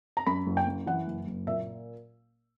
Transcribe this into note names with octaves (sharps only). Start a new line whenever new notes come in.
A#5
F#2 B5
F#1
G5
F#2
E3 F#5
F#1
F#1
A#2 E5